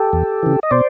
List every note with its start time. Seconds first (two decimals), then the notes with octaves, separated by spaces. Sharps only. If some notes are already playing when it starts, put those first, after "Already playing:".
Already playing: G4 A4
0.13 E2
0.43 C#3 E3
0.63 D#5
0.71 B2 C5 D5